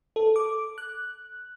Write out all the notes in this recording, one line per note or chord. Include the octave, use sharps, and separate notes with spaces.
A4
D6
F#6